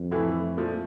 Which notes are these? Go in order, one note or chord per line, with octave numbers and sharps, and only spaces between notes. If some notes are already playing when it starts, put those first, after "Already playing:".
Already playing: F2
A2 E3 A3 E4
A#2 F3 A3